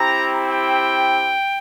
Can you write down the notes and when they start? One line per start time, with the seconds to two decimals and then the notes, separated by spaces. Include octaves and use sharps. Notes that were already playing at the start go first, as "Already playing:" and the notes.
Already playing: C4 E4 G4 A#5
0.50 G5